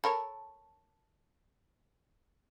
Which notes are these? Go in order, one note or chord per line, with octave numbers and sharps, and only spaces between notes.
A4 A#4 C#5 A5 B5